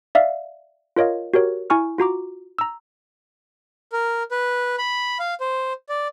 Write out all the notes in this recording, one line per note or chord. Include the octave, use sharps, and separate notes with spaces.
D5 E5 F5
F4 A#4 C#5 D#5 F5
F#4 G4 A#4 C#5
E4 G#5 C#6 F6
F4 F#4 A#5 D6
A#5 E6
A#4
B4
B5
F5
C5
D5